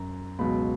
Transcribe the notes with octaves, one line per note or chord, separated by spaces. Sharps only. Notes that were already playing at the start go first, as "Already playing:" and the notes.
Already playing: F#2 A#5
C#2 B2 F#3 B5